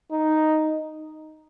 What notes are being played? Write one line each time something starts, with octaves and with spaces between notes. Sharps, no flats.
D#4